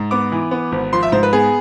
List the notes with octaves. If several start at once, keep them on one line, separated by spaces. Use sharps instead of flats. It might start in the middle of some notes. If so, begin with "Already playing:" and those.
Already playing: G#2
B3 D6
E3
B3
G#1
F3 C6
E5
G#2 C5
B4
B3 G#4